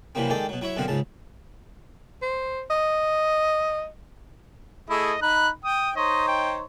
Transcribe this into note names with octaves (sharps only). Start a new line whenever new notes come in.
C3 E3 F#3 G3 A#3 C4
D#3 G#3 G4 A4 D5
B2 F#3
F#3 E4 C#5 E5
F#2 B2 D3 C4 F5 F#5
C#2 G#2 C#3 A5
C5
D#5
A3 E4 G#4 D#5
D#4 B5 F#6
G5 D#6
D#4 C5 C#5 D#5
G5